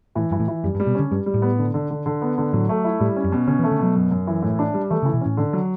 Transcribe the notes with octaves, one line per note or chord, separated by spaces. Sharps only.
A2 E3
G2 E3
A2
E3
F#2 G3
G2
G3
B2
D3 C#4
G2 G3
G3
A2
B3
D3
D3
D3
D3
B3
D3
A2 F#3
A3
E4
A2 G3
C#4
F#2
B2
D3 C#4
E3
A3
D3
B2 F#3
F#2
F#2
E3
A2
D4
G3
E3 A3
C#3
E3
B2
A2 C#4
D3
F#3